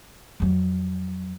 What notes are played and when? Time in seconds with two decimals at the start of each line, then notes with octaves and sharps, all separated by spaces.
0.40 F2 F#3